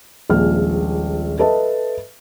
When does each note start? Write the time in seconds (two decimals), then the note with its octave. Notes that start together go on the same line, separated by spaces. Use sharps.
0.29 D#1 A#1 F3 G#3 F6
1.39 A4 B4 D#5 E5 A5